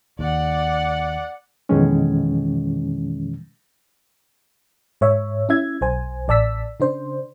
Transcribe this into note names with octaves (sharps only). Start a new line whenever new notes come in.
D#2 D5 F#5
F2 B2 D#3 E3 G#3 C#4
G#2 C#5 E5
C#4 E4 E5 G#6
B1 C5 G#5
A1 D5 A5 E6 B6
C#3 D4 C5